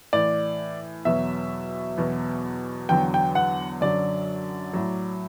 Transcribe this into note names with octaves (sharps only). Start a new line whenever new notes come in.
A2 E3 D5
E2 B2 F#3 E5
E2 B2 F#3
E2 D3 F#3 G5
G5
F#5
F#2 D3 F#3 D5
A2 F#3